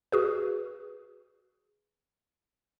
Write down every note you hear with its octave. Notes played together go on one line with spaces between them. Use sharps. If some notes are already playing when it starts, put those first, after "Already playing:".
F#4 G#4 B4